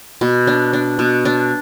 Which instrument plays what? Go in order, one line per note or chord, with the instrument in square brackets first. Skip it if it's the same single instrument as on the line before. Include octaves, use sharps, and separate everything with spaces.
[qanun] B2
D4
D4
B2
D4